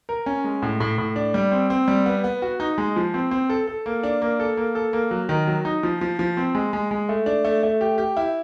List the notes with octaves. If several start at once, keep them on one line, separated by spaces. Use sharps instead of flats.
A#4
C#4
G#3
A2
A2
A2
D4
G3
C4
C4
G3
B3
B3
F#4
D#4
G#3
F3
C4
C4
A4
A4
A#3
D4
A#3
A4
A#3
A4
A#3
F#3
D#3
F#3
D#4
F3
F3
F3
C4
G#3
G#3
G#3
A3
D4
A3
A3
G4
G4
E4